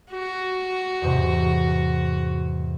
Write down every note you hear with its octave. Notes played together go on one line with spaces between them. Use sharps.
F#4
E2 G#2 C3